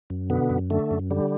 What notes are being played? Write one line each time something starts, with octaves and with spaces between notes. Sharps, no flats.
F#2
B2 D3 B3
F#2
D3 A3
F#2
D3 G3